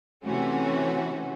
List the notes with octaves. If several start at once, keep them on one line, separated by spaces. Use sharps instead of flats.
C3 E3 A3 C#4 F#4